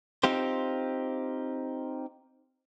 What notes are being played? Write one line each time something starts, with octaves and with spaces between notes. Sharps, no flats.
C4 D#4 F4 G4 C5